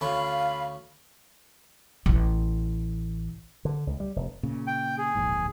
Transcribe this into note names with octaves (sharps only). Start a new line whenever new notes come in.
D2 C#4 F5 B5
A1 E4
D3
C#2
G3
F1
A#2 C#3
G5
G#4
D1 A#1 G#2